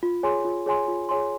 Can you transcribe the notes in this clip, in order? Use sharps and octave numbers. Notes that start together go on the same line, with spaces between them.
F4
G#4 C#5 G#5 C6
F4
G#4 C#5 G#5 C6
F4
G#4 C#5 G#5 C6